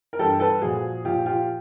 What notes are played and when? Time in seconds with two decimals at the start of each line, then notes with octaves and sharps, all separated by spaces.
0.13 A#4
0.19 G2 E3 G3 G4 A4
0.40 A4 B4
0.61 A#2 F3 F#4 G#4
1.05 A#2 F3 F4 G4
1.26 F4 G4